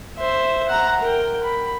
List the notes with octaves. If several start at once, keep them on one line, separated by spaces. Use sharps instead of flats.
C5 E5
F#5 A#5
A#4 G5
B5